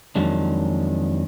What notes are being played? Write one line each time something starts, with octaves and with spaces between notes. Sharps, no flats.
F2 D#3 F3 F#3 G#3 D4